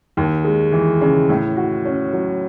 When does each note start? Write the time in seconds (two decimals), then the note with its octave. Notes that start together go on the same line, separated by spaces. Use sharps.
0.17 D#2
0.44 G#3
0.72 E3
1.01 C#3
1.29 A2
1.56 F#4
1.85 C#4
2.13 F#3